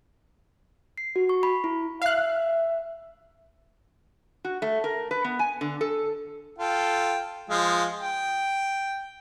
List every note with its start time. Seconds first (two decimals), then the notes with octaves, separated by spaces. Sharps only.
0.98 C7
1.16 F#4
1.29 C#6
1.43 B5
1.64 E4
2.02 E5 F5 F#6
4.44 F#4
4.62 A3
4.84 A#4
5.11 B4
5.24 B3
5.39 G#5
5.61 D3
5.81 A4
6.59 F4 A4 G5
7.50 F3 G#3 F4
8.00 G5